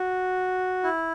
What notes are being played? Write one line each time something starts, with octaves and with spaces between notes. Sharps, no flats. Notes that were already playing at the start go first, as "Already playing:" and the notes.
Already playing: F#4
E4